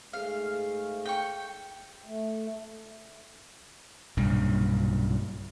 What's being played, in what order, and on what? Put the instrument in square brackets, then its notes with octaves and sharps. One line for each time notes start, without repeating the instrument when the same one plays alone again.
[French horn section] G#2 A3 G#4 [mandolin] F5
[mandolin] G5 C#6
[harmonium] A3
[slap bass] B1 G2 A#2 C#3